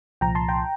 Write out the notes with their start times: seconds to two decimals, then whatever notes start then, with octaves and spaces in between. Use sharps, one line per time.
0.21 C2 A#2 F3 G5 A#5
0.35 A5 C6
0.49 G5 A#5